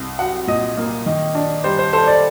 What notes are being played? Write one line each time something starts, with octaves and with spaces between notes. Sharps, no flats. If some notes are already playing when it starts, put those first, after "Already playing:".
Already playing: C2
F#3 F#5
A#2 D#5
A#3
D#3
D4
G3 C5
C5
A4 C5
D5